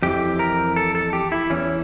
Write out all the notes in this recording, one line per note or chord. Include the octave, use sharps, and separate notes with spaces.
F2 E3 G4
A#4
A4
A4
G4
E4
E2 E3 C#4